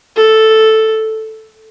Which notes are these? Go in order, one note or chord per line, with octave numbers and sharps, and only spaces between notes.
A4